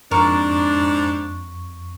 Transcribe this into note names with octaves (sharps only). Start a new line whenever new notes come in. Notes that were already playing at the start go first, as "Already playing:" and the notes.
F2 G#2 D4 A#4 C#6 C#7